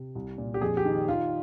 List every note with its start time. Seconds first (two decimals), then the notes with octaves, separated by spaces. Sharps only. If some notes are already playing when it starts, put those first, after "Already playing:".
Already playing: C3
0.15 C2
0.38 A#2
0.54 G4
0.61 F2 G#4
0.77 G4
0.85 D#3
1.08 D#3 F4